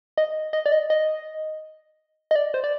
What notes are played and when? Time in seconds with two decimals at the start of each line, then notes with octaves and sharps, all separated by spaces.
0.18 D#5
0.53 D#5
0.66 D5
0.72 D#5
0.90 D#5
2.31 D#5
2.36 D5
2.54 C5
2.64 D5